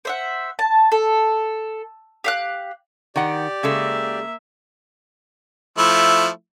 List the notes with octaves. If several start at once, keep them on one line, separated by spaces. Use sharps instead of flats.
C5 E5 F#5
A5
A4
G4 F5 F#6
D#3 G4 D5 F#5
C#3 G#3 A#3 A4 E5
F3 A3 E4